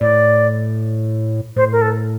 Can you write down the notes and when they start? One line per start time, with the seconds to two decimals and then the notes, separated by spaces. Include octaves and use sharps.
0.01 A2 D5
1.56 A2 C5
1.72 A#4
1.82 A4